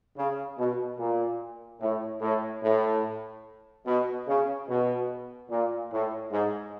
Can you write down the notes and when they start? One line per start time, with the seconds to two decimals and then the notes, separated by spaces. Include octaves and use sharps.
0.17 C#3
0.58 B2
0.99 A#2
1.81 A2
2.21 A2
2.63 A2
3.86 B2
4.27 C#3
4.69 B2
5.50 A#2
5.91 A2
6.32 G#2